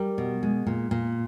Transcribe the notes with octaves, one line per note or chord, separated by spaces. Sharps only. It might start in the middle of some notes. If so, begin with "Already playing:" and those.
Already playing: G3 A#4
B2
G#3
A#2
A#2